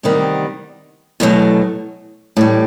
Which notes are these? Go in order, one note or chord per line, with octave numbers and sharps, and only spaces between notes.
D2 C3 D#3 G3 B3
E2 B2 F#3 A3
A2 E3 G3